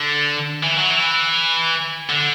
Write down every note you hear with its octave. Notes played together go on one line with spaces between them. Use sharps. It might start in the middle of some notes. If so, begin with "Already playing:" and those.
Already playing: D3
E3
F#3
E3
D3